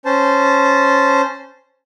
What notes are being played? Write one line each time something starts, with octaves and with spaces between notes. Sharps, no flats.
C#4 C5 A5